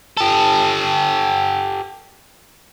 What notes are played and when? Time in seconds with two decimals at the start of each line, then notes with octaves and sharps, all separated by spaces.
0.17 G4 A4